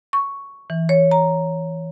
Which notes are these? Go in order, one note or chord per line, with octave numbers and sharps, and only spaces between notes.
C#6
E3
C#5
A#5